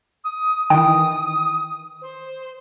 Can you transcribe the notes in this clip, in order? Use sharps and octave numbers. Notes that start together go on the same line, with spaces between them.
D#6
D#3 E3 G5 D#6
C5